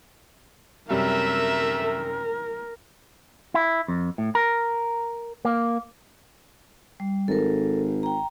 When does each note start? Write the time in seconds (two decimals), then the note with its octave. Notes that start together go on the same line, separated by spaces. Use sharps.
0.90 F#2 C3 G3 A3 A#4 E5
1.83 A#4
3.54 E4
3.88 F2
4.18 A2
4.35 A#4
5.45 A#3
7.00 G3
7.28 G#1 A4 A#4
8.03 G5 A#5